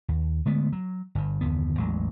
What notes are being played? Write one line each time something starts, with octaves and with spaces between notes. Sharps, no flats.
D#2
D3 G#3 A3 B3
F#3
G1 G2
F#1 D#2 D3 B3
A1 E2 F#3 G#3